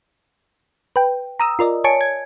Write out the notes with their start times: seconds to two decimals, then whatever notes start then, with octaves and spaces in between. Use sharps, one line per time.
0.96 B4 G5
1.40 A#5 D#6 E6
1.59 F4 A#4 D5 D#5
1.84 C#5 G#5 A5 C#7 D7
2.01 G#6